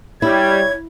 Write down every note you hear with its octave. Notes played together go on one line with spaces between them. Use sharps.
G3 E4 C#5 G#6